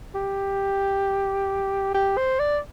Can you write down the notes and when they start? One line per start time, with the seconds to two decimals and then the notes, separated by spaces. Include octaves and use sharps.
0.15 G4
1.94 G4
2.17 C5
2.39 D5